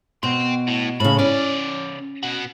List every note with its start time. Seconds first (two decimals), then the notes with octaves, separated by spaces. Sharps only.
0.23 B2 G5 C6
0.68 A2
1.00 A2 C#3 B5
1.19 C#3 C#4 D5
2.23 B2 F#4